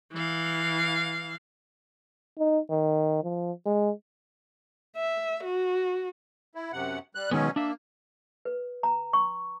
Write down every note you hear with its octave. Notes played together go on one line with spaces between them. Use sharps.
E3 F5
D#4
D#3
F3
G#3
E5
F#4
E4
F#2 C3 F#5
G3 F#6
B2 D#3 F#3 G#3 B3 C#4
A#3 D4 E5
B4
A#5
C#6